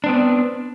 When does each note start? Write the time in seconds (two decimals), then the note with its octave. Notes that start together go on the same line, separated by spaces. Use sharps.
0.04 D4
0.06 C4
0.09 B3